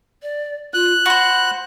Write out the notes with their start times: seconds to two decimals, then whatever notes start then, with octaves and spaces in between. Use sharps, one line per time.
0.22 D5
0.74 F4 F#6
1.06 F#4 C5 B5